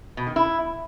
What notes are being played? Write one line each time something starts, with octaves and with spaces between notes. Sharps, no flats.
B2
D#3
E4